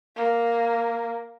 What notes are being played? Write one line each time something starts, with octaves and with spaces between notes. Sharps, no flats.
A#3